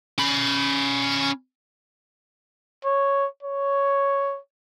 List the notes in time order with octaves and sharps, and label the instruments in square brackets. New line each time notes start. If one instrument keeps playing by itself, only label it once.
[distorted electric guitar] C#4 B5
[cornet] C#5
C#5